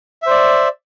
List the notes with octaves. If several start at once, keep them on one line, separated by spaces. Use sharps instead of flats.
C5 D5 E5